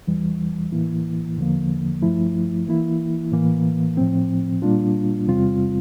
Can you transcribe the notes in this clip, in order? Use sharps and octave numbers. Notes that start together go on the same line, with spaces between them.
E2 E3 G3
A2 E3 A#3 E4
E2 D3 F3 A#3
G2 F3 A3 E4
E3 A#3 E4
A2 E3 A#3
A2 F3 C4
A#2 G3 A#3 D4 F4
E2 C3 G3 C4 F4